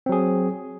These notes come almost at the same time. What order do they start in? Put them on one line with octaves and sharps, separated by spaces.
C4 F#3 G#4